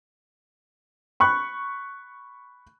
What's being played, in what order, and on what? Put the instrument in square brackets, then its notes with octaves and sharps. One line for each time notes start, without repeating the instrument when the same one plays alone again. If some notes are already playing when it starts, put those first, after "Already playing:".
[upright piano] B5 C#6 F#6